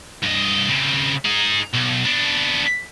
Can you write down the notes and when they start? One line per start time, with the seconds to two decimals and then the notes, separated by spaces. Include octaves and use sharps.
0.23 G2 D#5
0.68 C#3 C4
1.25 D#4 G#4
1.74 B1
2.05 B3 D4